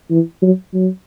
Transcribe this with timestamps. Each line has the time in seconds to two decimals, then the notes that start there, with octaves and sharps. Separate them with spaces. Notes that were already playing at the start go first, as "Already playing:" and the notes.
0.11 E3
0.42 F#3
0.74 F#3